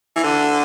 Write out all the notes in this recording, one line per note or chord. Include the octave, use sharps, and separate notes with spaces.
E3
D3